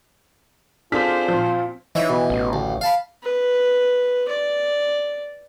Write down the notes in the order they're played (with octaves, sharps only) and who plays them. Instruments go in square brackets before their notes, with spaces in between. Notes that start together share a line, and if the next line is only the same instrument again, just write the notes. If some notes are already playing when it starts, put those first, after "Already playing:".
[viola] C4 C5 [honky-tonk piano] D4 F6 B6 [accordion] F4 G#4 A4
[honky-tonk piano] A#2 F3 [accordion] F4
[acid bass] E3 [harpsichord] D#4 C#5 E5
[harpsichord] B2
[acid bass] A1
[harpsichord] D2
F5 A5 B5
[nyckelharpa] B4
D5